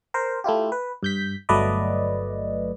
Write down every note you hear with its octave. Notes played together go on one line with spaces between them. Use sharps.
A#4 C5
A3 E4 F4 G4
B4
G2 G6 B6
G1 F#3 A3 B4 D5 D#5